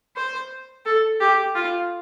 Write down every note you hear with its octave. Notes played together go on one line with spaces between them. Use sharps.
C5
A4
G4
F4